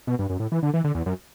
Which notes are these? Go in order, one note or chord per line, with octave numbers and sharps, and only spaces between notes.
B2
G2
F#2
A2
E3
D3
E3
D3
E2
F#2